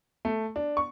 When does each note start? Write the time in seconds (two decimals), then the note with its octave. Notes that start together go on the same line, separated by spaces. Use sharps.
0.25 A3
0.56 D4
0.77 C#6